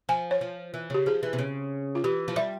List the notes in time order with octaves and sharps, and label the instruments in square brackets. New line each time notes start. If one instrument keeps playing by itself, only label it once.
[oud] F3 [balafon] G#5
[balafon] C#5
[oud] F3
E3
[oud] C#3 [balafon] G4
[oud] F3 [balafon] G#4
[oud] E3
C3
C#3
[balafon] F4
[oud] E3 [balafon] G4
[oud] F3
[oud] G3 [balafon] E5